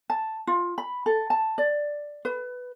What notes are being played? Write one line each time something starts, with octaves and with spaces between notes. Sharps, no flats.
A5
F4
B5
A4
A5
D5
B4